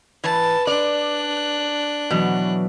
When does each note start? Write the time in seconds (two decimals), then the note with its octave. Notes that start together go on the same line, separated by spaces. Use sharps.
0.24 E3 B4 A5
0.67 D4 D5 F#6
2.11 B2 E3 F#3